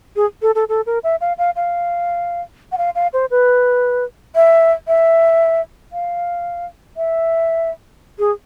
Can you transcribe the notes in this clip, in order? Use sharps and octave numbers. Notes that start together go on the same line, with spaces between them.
G#4
A4
A4
A4
A#4
E5
F5
F5
F5
F#5
F5
F5
C5
B4
E5
E5
F5
E5
G#4